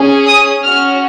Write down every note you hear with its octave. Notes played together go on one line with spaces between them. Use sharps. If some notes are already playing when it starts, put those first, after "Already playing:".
Already playing: C#4 G#4
D#6
C#4 F#4 F6